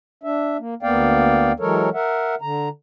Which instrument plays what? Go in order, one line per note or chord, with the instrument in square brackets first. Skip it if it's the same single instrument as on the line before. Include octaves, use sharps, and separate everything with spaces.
[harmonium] D4 E5
A#3
D2 A#3 B3 D5 F5 G5
E3 F#3 G#3 A4 A#4 C#5
A#4 E5 F#5
D3 A#5